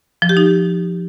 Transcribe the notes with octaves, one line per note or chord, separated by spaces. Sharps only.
F3
G4
D#4